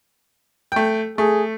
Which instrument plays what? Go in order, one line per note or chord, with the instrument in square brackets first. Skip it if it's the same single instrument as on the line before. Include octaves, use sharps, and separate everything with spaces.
[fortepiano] A3 G5
[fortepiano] A3 [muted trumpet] G#4